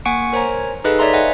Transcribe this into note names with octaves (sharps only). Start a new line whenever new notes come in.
A#3 F#5 G#5 C#6 C#7 D7
A#4 C5 C#5 G#5 A#5
D#4 G#4 A4 B4 D#5 F5
B4 C#5 D5 E5 A#5 C6
D#5 F5 F#5 G#5